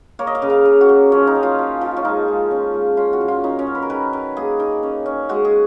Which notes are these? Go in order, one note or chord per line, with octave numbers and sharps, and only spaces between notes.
A#3 C#5
D#5
F5
C#3
F5
C#3
F#4
F#3
F3 C#4
D#4
C#4
F4
F3
F3
C#4
G#3 D#4
G#3
C#4
G#3
C#4 F4
F#4
A#2
F4
C#4 D#4
C#4
F#3
B4
A#4
D#3 B4
D#3
A#3 G#4
D#3
C#4
C#4
G#3 F#4
G#4